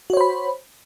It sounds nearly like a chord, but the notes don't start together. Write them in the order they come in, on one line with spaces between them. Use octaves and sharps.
F#4 C#5 C5 B5